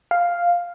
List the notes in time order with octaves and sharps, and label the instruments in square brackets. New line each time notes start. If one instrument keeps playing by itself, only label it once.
[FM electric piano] F5